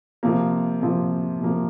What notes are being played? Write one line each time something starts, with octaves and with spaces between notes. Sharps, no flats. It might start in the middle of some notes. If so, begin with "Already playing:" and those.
C3 F3 A#3
C3 F3 A#3
C3 F3 A#3